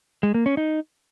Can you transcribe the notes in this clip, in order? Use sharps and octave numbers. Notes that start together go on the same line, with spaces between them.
G#3
A#3
C#4
D#4